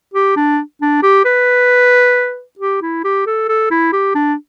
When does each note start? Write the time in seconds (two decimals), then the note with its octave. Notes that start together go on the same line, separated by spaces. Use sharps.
0.13 G4
0.36 D4
0.81 D4
1.03 G4
1.25 B4
2.59 G4
2.82 E4
3.04 G4
3.26 A4
3.48 A4
3.71 E4
3.93 G4
4.15 D4